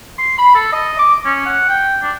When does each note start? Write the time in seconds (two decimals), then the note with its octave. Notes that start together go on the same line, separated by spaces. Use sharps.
0.19 C6
0.38 B5
0.55 A4
0.73 D#5
0.99 D6
1.25 C#4
1.46 F#5
1.69 G5
2.02 D4